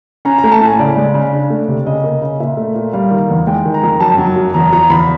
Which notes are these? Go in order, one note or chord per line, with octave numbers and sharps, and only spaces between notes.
C#4 A#5
A#5
A3
A5
A2 G#5
C#3 D5
G#3
C#3
D4
A3
C3
C#3 D#5
A#3
C#3
A#2 E5
A3
A#2
G3 F5
D#3
E2
G#3 G5
D#3
A#5
F2
F#2 A5
F#3
F#2
E2 A#5
F3 A#5
E2 B5